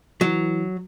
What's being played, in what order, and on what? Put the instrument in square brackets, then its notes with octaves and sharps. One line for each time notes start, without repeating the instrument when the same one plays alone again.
[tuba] E3 [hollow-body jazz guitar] F#3